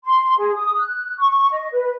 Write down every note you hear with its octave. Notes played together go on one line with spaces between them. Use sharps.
C6
G#4
D#6
F#6
C#6
D#5
B4